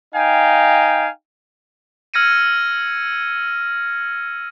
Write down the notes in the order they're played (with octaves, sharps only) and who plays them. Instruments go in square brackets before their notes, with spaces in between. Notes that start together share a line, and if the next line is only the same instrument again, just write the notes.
[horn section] D#4 F5 G5 G#5
[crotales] E6 F6 G#6 A#6 C#7 D#7